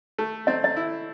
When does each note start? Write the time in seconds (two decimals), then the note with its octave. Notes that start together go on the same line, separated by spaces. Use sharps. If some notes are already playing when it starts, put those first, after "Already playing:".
0.19 A3
0.47 C4 D#5
0.64 D#5
0.76 E4